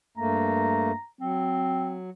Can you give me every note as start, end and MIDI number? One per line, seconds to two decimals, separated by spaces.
0.17 0.92 43
0.17 0.92 57
0.17 0.92 58
0.17 1.06 82
1.21 2.10 54
1.21 1.98 60